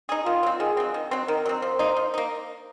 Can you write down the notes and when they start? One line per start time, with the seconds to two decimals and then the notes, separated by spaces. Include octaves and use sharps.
0.09 D#4 G#4
0.26 D#3 F4
0.43 F#3 C4
0.60 D#3 G#4
0.77 F#3 C4
0.94 D#3
1.11 F#3 C4
1.28 D#3 A#4
1.46 F#3 C4
1.62 F3 C5
1.79 A#3 D#4
1.97 F3
2.14 A#3 D#4